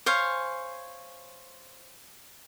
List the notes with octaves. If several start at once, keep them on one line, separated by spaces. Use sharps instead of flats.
C5 C#5 F5 G#5